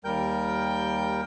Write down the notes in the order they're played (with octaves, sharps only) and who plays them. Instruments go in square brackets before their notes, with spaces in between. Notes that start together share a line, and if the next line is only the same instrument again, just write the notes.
[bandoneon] D#2 G3 A#4 G5 G6